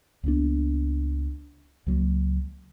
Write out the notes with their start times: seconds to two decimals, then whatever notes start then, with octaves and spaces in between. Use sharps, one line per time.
0.23 C#2 A#3 B3 D4
1.86 C#2 F#3 A#3